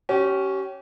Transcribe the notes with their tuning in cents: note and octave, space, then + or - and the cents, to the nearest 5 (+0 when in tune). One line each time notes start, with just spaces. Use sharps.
C#4 +0 G4 -30